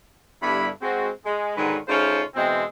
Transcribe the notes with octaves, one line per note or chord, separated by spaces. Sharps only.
G2 D3 G3 B3 E4 B5
G#3 C4 F#4
G#3
G#2 B2 D3 D#3 F#3 B4
C#3 A3 C#4 D#4 F4 C5
B2 E3 G#3 C4